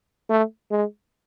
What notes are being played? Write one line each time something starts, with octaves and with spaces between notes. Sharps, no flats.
A3
G#3